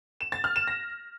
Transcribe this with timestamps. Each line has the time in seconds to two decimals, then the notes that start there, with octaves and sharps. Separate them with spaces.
0.21 E7
0.32 A6
0.44 F6
0.56 E7
0.67 A#6